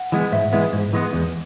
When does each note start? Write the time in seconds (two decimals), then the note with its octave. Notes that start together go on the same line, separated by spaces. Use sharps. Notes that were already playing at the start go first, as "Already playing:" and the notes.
Already playing: F#5
0.12 E3 G#3 B3
0.32 G#2 E5
0.53 E3 G#3 B3
0.73 G#2
0.93 E3 G#3 B3
1.13 E2